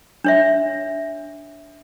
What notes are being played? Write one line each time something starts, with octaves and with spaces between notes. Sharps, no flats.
D4 C#5 E5